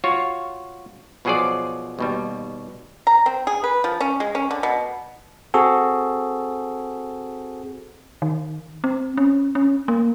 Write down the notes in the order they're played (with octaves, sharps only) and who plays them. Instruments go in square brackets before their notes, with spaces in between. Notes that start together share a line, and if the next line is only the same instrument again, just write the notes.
[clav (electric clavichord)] F4 F#4 C#5 F5
B2 F3 F#3 G#4 C5 D5
D#2 B2 G3
[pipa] A#5
C4
G#4
B4
F3
C#4
G#3
C#4
D3
B2
[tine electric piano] C4 F#4 G#4 A4
[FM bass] D#3
C4
C#4
C#4
A#3